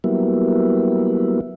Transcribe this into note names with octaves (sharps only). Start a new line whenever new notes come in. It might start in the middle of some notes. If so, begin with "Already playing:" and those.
F#3 G3 A#3 B3 E4